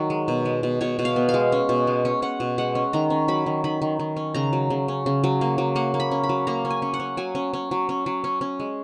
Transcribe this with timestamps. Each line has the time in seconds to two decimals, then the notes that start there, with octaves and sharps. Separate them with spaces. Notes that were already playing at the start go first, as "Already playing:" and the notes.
Already playing: D#3 F#3
0.10 G#3
0.28 B2
0.45 G#3
0.63 B2
0.81 B2 C#5
0.99 B2
1.05 F5
1.16 B3
1.29 F5
1.34 G#3
1.52 C#4
1.69 B2
1.87 G#3
2.05 C#4
2.22 C#4 F#5
2.40 B2
2.58 G#3 F#5
2.75 C#4
2.93 D#3 A#5
3.10 C#4
3.28 F#3 B5
3.46 D#3
3.64 D#3 B5
3.82 D#3
3.99 D#3
4.17 C#4
4.34 C#3 A#5
4.53 F#3
4.70 C#3
4.88 C#4
5.06 C#3
5.24 F#3
5.41 A#3
5.58 F#3
5.76 A#3 F#5
5.94 A#3
6.00 B5
6.11 C#4
6.24 B5
6.29 F#3
6.47 A#3 A#5
6.65 C#4
6.70 G#5
6.82 C#4
6.94 F#5
7.00 C#4
7.17 F#3 G#5
7.35 C#4
7.54 C#4
7.71 F#3
7.89 C#4
8.06 F#3
8.24 C#4
8.41 C#4
8.60 G#3